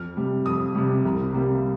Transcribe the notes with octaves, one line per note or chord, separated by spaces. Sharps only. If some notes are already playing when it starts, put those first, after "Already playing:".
Already playing: F2 F6
C3 G3
F2 D#6
C3 G3
C2
C3 G3 A#3